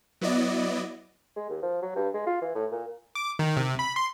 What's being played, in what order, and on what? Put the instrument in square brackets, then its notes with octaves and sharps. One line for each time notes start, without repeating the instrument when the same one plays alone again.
[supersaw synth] F#3 B3 E4 D5 D#5
[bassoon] G#3
D#2
F3
F#3
G2
G#3
F4
E3
A2
A#2
[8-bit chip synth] D6
D#3
C3
B5
C6